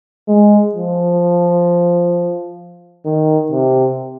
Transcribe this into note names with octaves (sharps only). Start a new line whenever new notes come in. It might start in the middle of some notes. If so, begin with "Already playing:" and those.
G#3
F3
D#3
C3